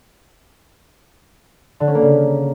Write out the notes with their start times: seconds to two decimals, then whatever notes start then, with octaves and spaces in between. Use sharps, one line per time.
1.80 D3
1.87 C#4
1.95 A#3
2.02 C#3